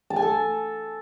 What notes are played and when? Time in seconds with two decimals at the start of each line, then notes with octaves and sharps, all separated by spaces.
0.10 A5
0.16 G#5
0.22 A4